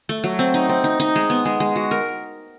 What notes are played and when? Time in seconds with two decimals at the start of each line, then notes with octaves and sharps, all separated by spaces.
0.09 A3
0.24 F#3
0.39 C4
0.54 D#4
0.69 C4
0.84 D#4
1.00 D#4
1.16 G#3
1.30 B3
1.45 G#3
1.60 G#3
1.76 F#4
1.91 A#4